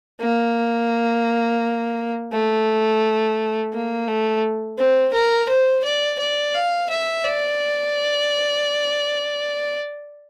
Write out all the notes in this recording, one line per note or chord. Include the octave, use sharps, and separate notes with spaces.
A#3
A3
A#3
A3
C4
A#4
C5
D5
D5
F5
E5
D5